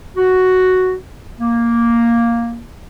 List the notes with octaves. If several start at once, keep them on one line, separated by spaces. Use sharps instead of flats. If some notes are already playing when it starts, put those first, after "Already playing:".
F#4
A#3